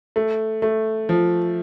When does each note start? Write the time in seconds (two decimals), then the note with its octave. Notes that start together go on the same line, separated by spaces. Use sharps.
0.16 A3
0.62 A3
1.09 F3